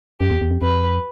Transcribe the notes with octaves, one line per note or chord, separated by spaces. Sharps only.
F#2 G4
E2
E2
F2
F2 B4